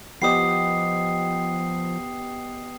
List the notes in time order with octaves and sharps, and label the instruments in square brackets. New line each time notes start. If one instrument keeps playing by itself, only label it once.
[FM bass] F3 [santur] B3 G4 D#5 [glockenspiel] D#6 C7